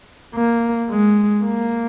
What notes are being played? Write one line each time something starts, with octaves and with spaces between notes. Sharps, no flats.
A#3
G#3
A#3